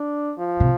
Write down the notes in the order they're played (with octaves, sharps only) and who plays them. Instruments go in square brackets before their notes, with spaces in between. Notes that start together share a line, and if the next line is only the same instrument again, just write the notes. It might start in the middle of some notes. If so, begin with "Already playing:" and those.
Already playing: [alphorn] D4
F3
[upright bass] C3